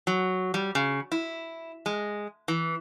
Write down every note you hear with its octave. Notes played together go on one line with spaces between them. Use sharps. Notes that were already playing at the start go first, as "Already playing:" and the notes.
F#3
G3
C#3
E4
G#3
E3